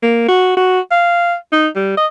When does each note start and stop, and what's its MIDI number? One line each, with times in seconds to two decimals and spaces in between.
0.03 0.24 58
0.28 0.54 66
0.57 0.80 66
0.91 1.35 77
1.52 1.68 63
1.76 1.96 55
1.97 2.07 75